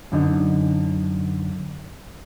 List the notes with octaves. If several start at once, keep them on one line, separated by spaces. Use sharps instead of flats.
F#2 D3 D#4